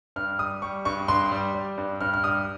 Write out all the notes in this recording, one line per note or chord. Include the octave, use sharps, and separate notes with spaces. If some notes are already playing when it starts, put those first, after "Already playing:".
G2 F6
G3 D#6
G3 C#6
G2 C#6
G2 C6
G3
G3
G2
G2 F6
F6
G3 D#6